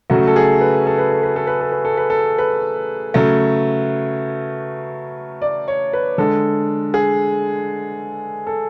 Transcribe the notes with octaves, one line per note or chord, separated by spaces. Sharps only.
C#3 F#3 A3 F#4
A4
G#4
B4
A4
B4
A4
B4
A4
B4
A4
B4
A4
B4
A4
B4
C#3 F#3 A3
D5
C#5
B4
D3 G#3 A4
G#4
A4